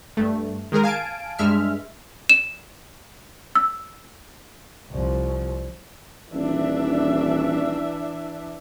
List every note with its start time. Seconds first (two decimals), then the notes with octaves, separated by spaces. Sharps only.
0.17 G2 A3
0.72 D#3 G#3 G#4 A#4
0.83 F5 G#5 A5 D7
1.39 G2 G#3 E5 F6
2.29 E7
3.55 E6
4.91 C2 F3
6.34 D#1 E3 D4 E5